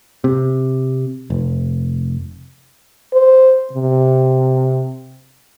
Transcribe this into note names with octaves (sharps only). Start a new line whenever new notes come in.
C3
F1
C5
C3